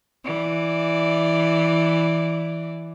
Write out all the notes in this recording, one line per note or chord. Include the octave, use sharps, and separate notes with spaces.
E3 D5